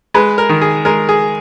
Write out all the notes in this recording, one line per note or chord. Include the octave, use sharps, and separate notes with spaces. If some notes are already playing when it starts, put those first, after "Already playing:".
G#3 B4
A#4
D#3
G#4
G#3 A#4
G#4